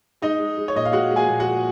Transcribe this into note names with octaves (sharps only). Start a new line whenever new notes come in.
G#3 D#4 D#5
G#3
G#3
C#5
A#2 D#5
F5
G#3 F#4 F#5
G#3
G#4 G#5
A#2
F#4 F#5
G#3